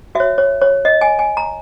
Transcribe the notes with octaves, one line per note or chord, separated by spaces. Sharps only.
F#4 E5
C#5
C#5
C#5
D#5
G#5
G#5
A#5